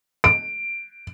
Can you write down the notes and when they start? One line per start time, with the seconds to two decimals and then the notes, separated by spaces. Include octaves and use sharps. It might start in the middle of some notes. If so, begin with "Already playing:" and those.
0.24 D7